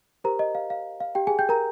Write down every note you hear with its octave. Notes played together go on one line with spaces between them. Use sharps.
G4 A#4 C5 A#5
D#5
F5
F5
F5
G4 G5
G#4 G#5
G5 G6
A#4 A#5